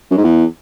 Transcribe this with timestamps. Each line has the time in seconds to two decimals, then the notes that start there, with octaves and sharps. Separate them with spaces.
0.11 F#2
0.17 G#2
0.24 E2